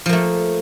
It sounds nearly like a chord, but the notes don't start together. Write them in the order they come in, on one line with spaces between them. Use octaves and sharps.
F3 A#3 A3